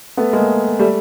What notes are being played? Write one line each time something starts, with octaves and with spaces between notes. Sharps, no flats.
A3 B3
G#3 A#3
G3 A3